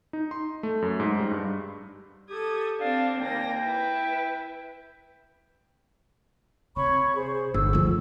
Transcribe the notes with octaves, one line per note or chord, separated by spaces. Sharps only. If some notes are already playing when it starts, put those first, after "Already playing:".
D#4
C6
A3
F#2
G#2
G3
G2
G4 A4 D#6 G#6
C4 D4 F5
D#2 A#3 G5 A#6
E4 B4
C3 C#5 B5 C#6
G#4 C5
G1 E6
D2 F3